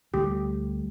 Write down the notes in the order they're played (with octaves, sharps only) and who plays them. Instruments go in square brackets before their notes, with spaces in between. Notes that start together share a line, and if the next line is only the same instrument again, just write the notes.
[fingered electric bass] D2 G3 A3 [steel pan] G4